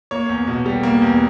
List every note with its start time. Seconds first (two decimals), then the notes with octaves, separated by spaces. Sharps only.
0.11 A#3 C#5
0.29 E2
0.47 B2
0.66 G3
0.83 A#3
1.02 E2